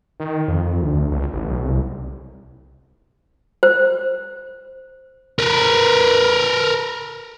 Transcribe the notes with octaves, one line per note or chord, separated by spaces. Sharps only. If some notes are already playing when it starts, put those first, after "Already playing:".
D#3
F2
D2
C#2
A1
B1
C2
C5
A#4 B4